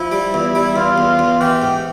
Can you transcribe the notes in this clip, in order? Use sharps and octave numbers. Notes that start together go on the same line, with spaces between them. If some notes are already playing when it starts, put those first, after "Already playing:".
Already playing: F3 E4
G3
E2
G3
E2 F4
E2
E2
E3 G4
G#2